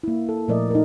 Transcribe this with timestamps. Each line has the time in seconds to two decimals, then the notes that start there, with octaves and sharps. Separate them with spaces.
0.03 A#3 E4
0.29 A4
0.48 A#2 F3 A3 A#4 D5 D#5
0.71 D#4 A#4